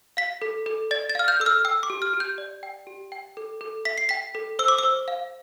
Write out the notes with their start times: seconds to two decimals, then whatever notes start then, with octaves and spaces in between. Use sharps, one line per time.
0.17 F5 B6
0.42 A4
0.66 A4
0.91 D5 A6
1.10 A6
1.15 F5 F6
1.28 G6
1.40 A4 E6
1.46 F6
1.65 G5 E6
1.83 D6
1.90 G4
2.02 F6
2.14 G4
2.20 G6
2.38 D5
2.63 G5
2.87 G4
3.12 G5
3.37 A4
3.61 A4
3.85 E5 B6
3.98 C7
4.09 G5 B6
4.35 A4
4.59 C5 E6
4.68 D6
4.78 E6
4.84 C5
5.08 F5